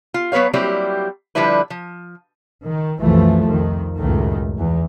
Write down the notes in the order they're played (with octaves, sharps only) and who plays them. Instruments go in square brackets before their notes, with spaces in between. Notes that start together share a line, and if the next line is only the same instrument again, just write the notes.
[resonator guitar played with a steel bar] F4
F#3 B3 B4 C#5 F5
F#3 G3 A#3 C4 E4 G4
D3 F3 G3 D4 E4 B4
F3
[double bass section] D#3
C2 F#2 E3 F3 A3
F2 D#3
C#2 F#2 A2 D#3 A3
E2 E3